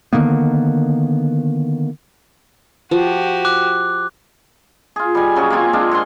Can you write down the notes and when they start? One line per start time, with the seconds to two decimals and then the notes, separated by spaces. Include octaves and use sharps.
0.13 D3 D#3 A#3 B3
2.91 F3 F#4 G4
3.45 D6 F#6
4.96 F4 G#4
5.15 G3 D#5 G#5
5.36 C#3 F#3 C#4 G#4
5.50 A#3 C4 F4 G#5
5.73 G#3 C4 D4 F4
5.91 G#2 F#5 C6